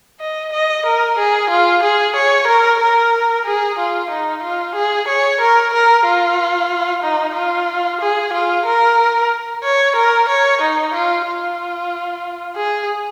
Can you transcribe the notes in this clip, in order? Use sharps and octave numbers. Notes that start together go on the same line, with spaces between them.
D#5
D#5
A#4
G#4
F4
G#4
C#5
A#4
A#4
G#4
F4
D#4
F4
G#4
C#5
A#4
A#4
F4
D#4
F4
G#4
F4
A#4
C#5
A#4
C#5
D#4
F4
F4
G#4